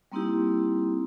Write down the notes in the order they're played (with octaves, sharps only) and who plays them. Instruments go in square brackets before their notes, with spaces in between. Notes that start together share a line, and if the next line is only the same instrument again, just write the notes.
[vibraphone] G3 A#3 C4 D#4 E4 G4